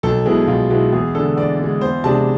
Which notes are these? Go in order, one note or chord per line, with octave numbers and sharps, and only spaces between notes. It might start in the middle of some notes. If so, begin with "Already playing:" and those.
B1 A4
B2 G#3 B3 E4 G#4
B1 F4
B2 G#3 B3 E4
E2 G#4
D3 G#3 A4
E2 D5
D3 G#3
E2 C5
C3 G#3 D4 A5